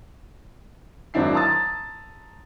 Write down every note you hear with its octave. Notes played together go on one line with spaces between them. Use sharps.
G#1 F#3 C4 D4 E4 C7
A5 A#5 C6 D#6 E6 A6